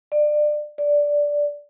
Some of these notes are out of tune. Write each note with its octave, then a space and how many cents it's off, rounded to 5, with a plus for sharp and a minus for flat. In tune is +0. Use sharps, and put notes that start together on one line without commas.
D5 +25
D5 -5